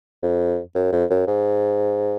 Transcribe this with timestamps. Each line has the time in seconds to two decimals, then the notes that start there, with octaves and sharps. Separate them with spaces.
0.22 F2
0.75 F#2
0.93 F2
1.10 F#2
1.27 G#2